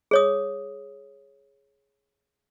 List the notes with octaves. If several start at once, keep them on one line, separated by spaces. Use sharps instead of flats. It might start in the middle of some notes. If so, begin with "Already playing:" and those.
G#4 C#5 D#6